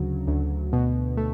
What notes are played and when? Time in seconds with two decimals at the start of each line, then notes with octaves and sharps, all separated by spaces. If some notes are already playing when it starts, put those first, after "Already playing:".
Already playing: D2 C#3 F#3
0.27 D2
0.73 B2
1.17 A3